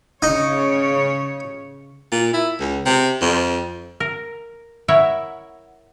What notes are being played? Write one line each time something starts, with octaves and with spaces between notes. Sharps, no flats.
C#3 D#4 C#5
A#2
E4
C#2
C3
F2
A#4
E4 A#4 C#5 E5 F#5